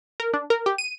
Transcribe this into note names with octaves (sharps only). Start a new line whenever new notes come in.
A#4
D4
A#4
G4
D#7